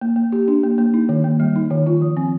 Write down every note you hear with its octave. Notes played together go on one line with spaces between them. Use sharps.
A#3
A#3
G4
D4
A#3
A#3
D#4
D#3
A#3
G3
D#4
D#3
F4
F3
C4